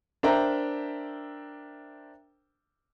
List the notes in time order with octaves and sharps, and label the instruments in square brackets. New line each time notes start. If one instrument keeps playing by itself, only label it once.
[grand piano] D4 A#4 C5 E5 G5 A#5